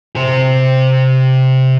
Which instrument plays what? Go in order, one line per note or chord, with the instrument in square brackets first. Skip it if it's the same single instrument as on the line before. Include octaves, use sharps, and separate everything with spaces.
[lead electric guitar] C3 C5